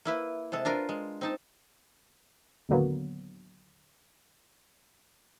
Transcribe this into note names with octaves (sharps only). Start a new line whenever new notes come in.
A#3 E4 B4
C3 G#3 A4
D4 F4 A#4 B4
G#3
C4 D#4 A5
D#2 A2 D3 F#3 A#3 B3